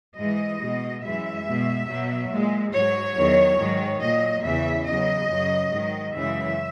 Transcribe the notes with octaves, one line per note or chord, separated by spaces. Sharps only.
G#2 E3 G#3 D#5
B2 G#3
F#2 E3 G#3 E5
B2 G#3
B2 F#3
A#2 G#3
G#2 F#3 C#5
E2 D#3 F#3
G#2 D#3 F#3
A#2 F#3 D#5
E2 C#3 E3 E5
E2 C#3 F#3 D#5
F#2 C#3 F#3
G#2 D#3 F#3
F#2 C#3 E3 G#3 E5